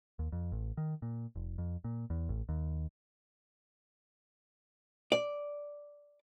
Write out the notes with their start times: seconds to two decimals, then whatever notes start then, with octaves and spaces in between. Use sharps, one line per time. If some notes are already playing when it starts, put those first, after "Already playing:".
0.19 D#2
0.32 F2
0.52 A1
0.77 D#3
1.02 A#2
1.36 F1
1.58 F2
1.84 A#2
2.10 E2
2.29 A1
2.49 D#2
5.12 D5